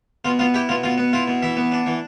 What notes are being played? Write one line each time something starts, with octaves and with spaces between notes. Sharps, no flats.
B2 F4
B3 F4
E4 G4
B2 F4
B2 F4
B3
E4 F4
B2
E3 E5
B3
D4
E3